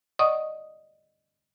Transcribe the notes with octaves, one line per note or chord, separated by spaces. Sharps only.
D5 D#5 F#5 C#6 D#6